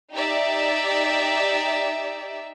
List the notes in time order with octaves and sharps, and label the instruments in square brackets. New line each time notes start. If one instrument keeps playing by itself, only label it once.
[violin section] D#4 G4 D5 E5